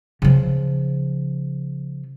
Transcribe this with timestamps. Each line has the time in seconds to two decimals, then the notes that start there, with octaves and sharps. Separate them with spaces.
0.22 C#3 F3